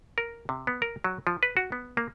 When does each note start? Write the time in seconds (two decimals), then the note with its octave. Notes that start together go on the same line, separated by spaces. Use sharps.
0.18 A#4
0.49 C3
0.67 B3
0.82 A#4
1.04 F#3
1.27 F3
1.43 B4
1.57 F#4
1.72 B3
1.97 A#3